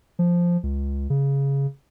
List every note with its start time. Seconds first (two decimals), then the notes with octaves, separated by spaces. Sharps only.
0.19 F3
0.63 C#2
1.10 C#3